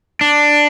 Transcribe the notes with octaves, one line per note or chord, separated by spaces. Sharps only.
D4